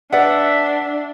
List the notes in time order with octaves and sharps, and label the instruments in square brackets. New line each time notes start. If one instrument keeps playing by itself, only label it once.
[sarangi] D4 [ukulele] B4 D5 [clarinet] E5 [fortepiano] F#5